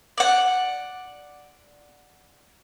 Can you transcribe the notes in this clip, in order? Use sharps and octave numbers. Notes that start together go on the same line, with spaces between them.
D5 F#5